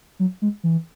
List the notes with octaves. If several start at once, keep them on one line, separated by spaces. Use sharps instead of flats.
F#3
G#3
E3